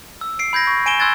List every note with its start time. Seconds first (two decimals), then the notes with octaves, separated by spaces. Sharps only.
0.21 E6
0.39 C7 D7
0.53 B5 G6 G#6 A#6
0.67 C#6 A#6
0.86 G#5 D7 E7 G7
1.00 C6 E6 F#6 G#6 A6